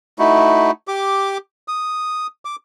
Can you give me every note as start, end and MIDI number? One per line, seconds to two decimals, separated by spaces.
0.19 0.71 57
0.19 0.71 63
0.19 0.71 64
0.19 0.71 66
0.88 1.38 67
0.88 1.38 86
1.68 2.27 87
2.45 2.56 86